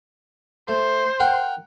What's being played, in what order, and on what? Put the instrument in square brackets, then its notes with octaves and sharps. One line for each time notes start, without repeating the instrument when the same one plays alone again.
[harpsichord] A3 [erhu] C5
[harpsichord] A#4 F#5 G5